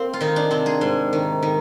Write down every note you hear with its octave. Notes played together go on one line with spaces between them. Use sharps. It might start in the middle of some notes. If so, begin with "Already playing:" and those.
Already playing: A#3 C4 G4
F4
D#3 D#4
D4
C3 C4
G#4
G#2
D#3
D#3